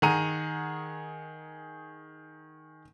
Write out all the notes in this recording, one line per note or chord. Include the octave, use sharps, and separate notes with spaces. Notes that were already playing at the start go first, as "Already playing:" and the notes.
D#3 G#4 F#5 A#5 D#7